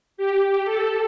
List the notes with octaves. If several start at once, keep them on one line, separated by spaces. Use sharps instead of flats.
G4
A4